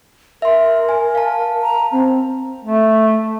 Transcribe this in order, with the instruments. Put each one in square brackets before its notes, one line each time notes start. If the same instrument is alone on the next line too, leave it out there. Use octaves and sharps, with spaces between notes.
[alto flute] A#4 [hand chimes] E5 C6
[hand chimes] G#5
F5 A5
[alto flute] A#5
C4
[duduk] A3